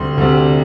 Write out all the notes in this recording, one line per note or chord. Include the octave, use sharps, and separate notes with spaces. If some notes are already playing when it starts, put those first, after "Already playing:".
Already playing: D2 C3 G3 C6
D2 C3 G3